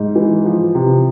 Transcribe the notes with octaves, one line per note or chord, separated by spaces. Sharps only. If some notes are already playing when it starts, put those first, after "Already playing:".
Already playing: G#2
E3
F3
C3